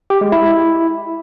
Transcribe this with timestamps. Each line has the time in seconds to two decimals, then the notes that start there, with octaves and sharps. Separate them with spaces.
0.10 G4
0.21 G#3
0.32 E4